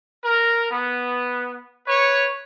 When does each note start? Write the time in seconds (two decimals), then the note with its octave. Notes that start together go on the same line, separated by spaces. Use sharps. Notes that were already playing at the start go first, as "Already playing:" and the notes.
0.23 A#4
0.70 B3
1.87 B4 C#5